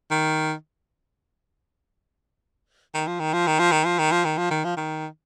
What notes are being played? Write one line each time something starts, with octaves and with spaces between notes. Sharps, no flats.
D#3
D#3
F3
D#3
F3
D#3
F3
D#3
F3
D#3
F3
D#3
F3
D#3
F3
D#3